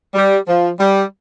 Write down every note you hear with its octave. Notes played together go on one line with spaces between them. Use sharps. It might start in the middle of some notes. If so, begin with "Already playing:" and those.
G3
F3
G3